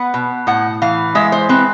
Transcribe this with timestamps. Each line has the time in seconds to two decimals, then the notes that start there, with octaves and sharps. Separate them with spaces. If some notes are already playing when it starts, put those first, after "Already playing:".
Already playing: B3 F#5
0.14 B2
0.47 A2 F#5
0.82 E3 F5
1.15 G#3 E5
1.32 C5
1.49 C4 B4